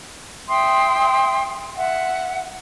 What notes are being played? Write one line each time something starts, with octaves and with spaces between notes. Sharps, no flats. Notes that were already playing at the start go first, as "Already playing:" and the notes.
E5 G5 C6 D#6
E5 F#5